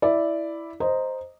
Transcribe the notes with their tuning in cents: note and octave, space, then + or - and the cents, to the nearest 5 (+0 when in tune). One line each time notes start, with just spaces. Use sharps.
E4 +0 D5 +0
C5 +0 D#5 +0 A#5 +0